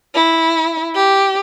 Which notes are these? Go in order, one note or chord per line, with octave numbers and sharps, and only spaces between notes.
E4
G4